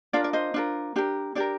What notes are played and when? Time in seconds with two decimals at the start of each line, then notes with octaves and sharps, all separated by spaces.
0.13 D4 F4 A#4 D5 F5
0.24 D5
0.33 C5 D#5
0.54 D4 F4 A#4
0.96 D4 G4 A#4
1.35 D4 G4 A#4 D5